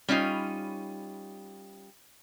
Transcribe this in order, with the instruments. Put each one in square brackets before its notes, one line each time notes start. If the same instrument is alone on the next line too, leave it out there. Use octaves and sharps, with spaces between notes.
[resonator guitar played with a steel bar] G3 C#4 D#4 F4